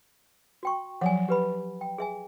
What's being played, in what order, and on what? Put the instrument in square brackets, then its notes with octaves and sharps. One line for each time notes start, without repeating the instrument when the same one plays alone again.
[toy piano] F#4 G5 C#6
[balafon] F3 F#3 [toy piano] F#5 G#5
[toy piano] G4 B4 B5
G5
G#4 E5 G#5